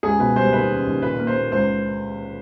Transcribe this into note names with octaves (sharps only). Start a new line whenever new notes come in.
C#2 G#4
B2 B4
G3 C5
D#2 B4
C#3
D#2
A#2 B4
A#3
C5
A#3
C#2 C5